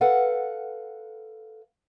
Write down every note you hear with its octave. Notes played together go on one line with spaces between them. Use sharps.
A4 B4 F5 F#5